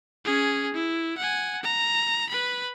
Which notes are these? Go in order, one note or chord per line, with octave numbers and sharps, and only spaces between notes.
C#4 G#4
E4
F#5 G#5
A#5
B4 B5